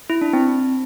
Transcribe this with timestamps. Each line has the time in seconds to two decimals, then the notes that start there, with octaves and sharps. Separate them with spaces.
0.10 E4
0.21 D4
0.33 C4